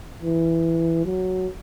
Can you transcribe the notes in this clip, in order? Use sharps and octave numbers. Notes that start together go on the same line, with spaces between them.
E3
F#3